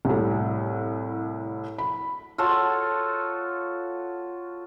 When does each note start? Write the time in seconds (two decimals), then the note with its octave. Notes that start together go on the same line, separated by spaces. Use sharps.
0.05 C2 A2
1.78 B5
2.38 F4 F#4 A4 C#5